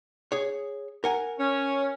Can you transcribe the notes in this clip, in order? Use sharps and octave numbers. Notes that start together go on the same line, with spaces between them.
G#4 C#5
A#4 F#5 G#5
C#4